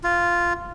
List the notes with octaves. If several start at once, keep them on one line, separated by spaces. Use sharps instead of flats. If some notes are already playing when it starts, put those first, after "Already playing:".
F4